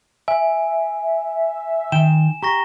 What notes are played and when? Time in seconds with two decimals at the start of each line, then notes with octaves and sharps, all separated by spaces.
0.28 E5 G#5
1.92 D#3 G5 E7
2.43 G4 A#5 C#6 A#6